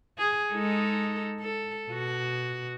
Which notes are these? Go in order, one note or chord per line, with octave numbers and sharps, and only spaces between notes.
G#4
G#3 D#4 A4
A4
B2 F#4